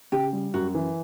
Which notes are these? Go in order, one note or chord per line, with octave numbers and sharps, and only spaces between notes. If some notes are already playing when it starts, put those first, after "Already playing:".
C#3 G4
G3
F#2 F#4
E3